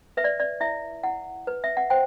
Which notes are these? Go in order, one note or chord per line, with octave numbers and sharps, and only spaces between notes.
B4 E5
D5
D5
E4 E5
E4 F#5
B4
E5
F#5
C5 G5